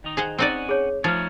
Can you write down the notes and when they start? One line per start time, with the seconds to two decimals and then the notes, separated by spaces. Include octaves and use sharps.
0.04 D#3 D#4
0.17 G#4 C5 F#5
0.38 C4 C#4 D#4 D5 F#5 G#5
0.69 G#4 C#5
1.04 F3 A3 D#4 C#5 F6 A6